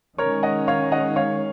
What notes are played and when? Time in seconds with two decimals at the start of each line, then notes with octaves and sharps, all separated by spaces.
0.18 D#3 G#3 C#4 A#4 C#5
0.43 D#5 F#5
0.68 C#5 F5
0.92 D#5 F#5
1.16 C#5 F5